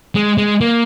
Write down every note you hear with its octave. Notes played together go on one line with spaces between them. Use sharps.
G#3
G#3
A#3